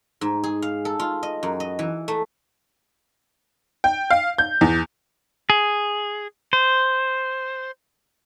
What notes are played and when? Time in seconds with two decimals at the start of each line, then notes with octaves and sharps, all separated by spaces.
0.21 G#2
0.44 G#4
0.62 F5
0.85 A4
0.99 F4
1.23 D#5
1.43 F#2
1.60 D#5
1.79 E3
2.08 A3
3.84 G5
4.10 F5
4.38 G6
4.61 E2
5.50 G#4
6.53 C5